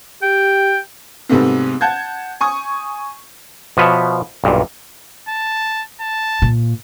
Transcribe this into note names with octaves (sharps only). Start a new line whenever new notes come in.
G4 G5
G#2 C3 G3 A3 B3 C4
F#5 A5 G6 G#6
G#5 C#6 D#6
B2 F3 B4 C#5 E5
B1 G2 A#2
A5
A5
A#2